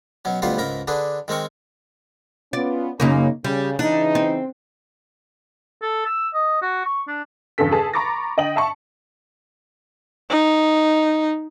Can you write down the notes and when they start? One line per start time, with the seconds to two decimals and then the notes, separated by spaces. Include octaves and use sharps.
0.25 B2 F#3 C#4
0.42 D2 B2 G3 F4 B4 F5
0.58 C#2 G#2 A#4 A#5 B5
0.88 D3 D4 G#4 B4
1.28 D#3 G#3 C4 A#4 C#6
2.53 B3 C#4 F4 D5
3.00 F#2 C#3 A#3 C#4 D#4
3.44 C#3 G3
3.79 C#3 E3 D4 D#4
4.15 C4
5.82 A4
6.06 E6
6.34 D#5
6.62 F#4
6.85 C#6
7.08 D4
7.58 E2 G2 C#3 A4 B6
7.71 G#4 A4 A5
7.94 A#5 B5 C#6 D6 A6 A#6
8.37 D3 D#5 G5 F#7
8.56 E5 A5 C#6 C#7
10.30 D#4